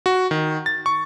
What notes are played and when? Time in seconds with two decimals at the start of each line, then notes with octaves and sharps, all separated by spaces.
0.06 F#4
0.31 D#3
0.66 A6
0.86 C#6